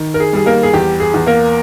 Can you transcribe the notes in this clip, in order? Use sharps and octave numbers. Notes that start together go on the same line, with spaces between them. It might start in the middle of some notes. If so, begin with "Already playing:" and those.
Already playing: D#3
A#4
G#4
G3 G#4
A#3 A#4
G#4
E2 G4
G#4
E2
A#3 A#4